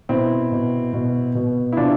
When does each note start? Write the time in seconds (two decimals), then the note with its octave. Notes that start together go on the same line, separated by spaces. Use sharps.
0.09 B2 C4 E4
0.52 B2
0.93 B2
1.35 B2
1.73 E4
1.77 C3 D4 F4